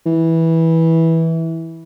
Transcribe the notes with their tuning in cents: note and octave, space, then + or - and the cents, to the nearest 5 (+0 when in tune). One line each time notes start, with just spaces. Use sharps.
E3 -15